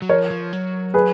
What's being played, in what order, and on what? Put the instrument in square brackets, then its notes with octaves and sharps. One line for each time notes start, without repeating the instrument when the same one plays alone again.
[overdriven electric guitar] F#3
[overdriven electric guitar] F3 [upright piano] A#4 C#5
[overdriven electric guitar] F3
F#3
[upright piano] G#4 B4